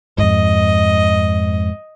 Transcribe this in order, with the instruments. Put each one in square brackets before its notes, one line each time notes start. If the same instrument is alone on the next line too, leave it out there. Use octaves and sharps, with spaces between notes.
[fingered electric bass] F2 G#2 [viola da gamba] D#5